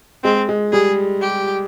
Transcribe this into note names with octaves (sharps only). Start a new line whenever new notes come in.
G#3 C4
G#3
G3 G#4
G4